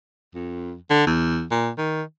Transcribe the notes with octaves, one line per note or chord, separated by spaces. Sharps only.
F2
D3
E2
A#2
D#3